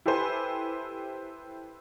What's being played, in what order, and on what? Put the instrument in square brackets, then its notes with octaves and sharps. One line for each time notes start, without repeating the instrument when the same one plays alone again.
[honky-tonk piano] E4 G4 A4 B4 C5 G#5